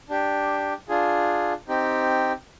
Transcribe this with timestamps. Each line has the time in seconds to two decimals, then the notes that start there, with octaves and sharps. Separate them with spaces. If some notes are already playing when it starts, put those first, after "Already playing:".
0.10 D4 G4
0.89 D4 F4 G#4
1.68 C4 D#4 G4